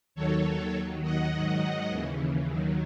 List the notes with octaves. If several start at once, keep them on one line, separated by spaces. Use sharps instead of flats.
D#2 D#3 F#3 A4 C#5
D#2 D#3 F#3
D#5 F#5
G#2 D#3 F#3
D#2 C#3 E3
D#2 D#3 F#3